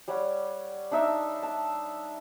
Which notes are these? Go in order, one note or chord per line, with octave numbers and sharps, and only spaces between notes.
G3 C#5 F#5
D4 D#4 E5 E6
A5